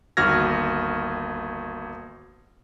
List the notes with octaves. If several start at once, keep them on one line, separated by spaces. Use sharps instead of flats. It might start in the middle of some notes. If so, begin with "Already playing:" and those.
G1 D#2 F#4 F6 G#6 A#6